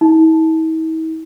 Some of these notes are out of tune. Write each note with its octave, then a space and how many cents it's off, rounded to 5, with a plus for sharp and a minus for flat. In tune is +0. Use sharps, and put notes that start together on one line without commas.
E4 -45